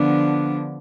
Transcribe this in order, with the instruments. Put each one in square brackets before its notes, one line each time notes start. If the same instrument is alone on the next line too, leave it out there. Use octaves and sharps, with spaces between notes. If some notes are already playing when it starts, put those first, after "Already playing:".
Already playing: [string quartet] D3 F3 B3 D4